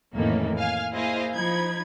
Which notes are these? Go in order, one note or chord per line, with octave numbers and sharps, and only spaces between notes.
F2 A2 D#3 E3 A#3 C#4
F5 G#5 F6
A#3 E4 G#4 C5 D#5 F5
F3 D#4 B5 G#6